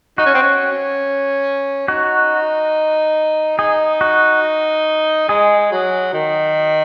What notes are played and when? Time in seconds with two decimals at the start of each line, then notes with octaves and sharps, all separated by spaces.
0.18 D#4 F#4
0.26 C#4
0.34 C4
0.43 C#4
1.88 D#4 F#4
3.58 D#4 G#4
4.01 F#4
5.28 G#3 G#4
5.71 F#3
6.14 D#3